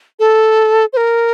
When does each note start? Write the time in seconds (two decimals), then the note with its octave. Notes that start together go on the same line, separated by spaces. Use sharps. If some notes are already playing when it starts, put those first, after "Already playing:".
0.19 A4
0.93 C5
0.97 A#4